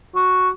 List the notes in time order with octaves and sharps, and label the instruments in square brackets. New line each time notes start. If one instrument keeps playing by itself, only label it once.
[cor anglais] F#4